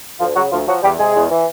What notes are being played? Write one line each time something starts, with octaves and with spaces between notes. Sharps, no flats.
D2 F3 F4
C#3 F#3 F#4
D2 F3 F4
F3 F#3 F#4
E2 G3 G4
C3 G#3 G#4
E2
E3